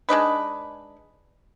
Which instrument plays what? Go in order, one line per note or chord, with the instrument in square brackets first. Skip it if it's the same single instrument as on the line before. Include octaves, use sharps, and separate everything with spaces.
[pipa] G#3 D4 D#4 B4